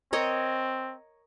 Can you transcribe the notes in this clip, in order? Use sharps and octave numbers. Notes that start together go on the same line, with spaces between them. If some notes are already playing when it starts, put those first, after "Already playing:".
C4 A#4 C#5 D#5